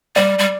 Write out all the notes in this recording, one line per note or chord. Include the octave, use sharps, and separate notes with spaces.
G3 D5
G3